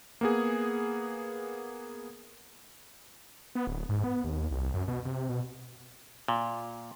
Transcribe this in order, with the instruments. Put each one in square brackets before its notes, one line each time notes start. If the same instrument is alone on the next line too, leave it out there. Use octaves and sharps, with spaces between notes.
[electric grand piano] A#3 B3 G#4
[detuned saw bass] B3
D1
G#2
B3
D#2
C2
F#2
B2
C3
B2
[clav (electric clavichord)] A#2